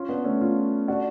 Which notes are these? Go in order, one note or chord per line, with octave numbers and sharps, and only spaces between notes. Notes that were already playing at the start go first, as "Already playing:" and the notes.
Already playing: C#4 F4
B3 D4
A3 C#4
C#4 F4
D4 F#4